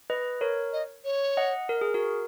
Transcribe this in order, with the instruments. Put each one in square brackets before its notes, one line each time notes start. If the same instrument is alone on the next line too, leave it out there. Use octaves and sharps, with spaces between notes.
[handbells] B4 D#5
A#4 C#5
[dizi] D#5
C#5
[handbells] D#5 F#5
A#4
G#4
F#4 A#4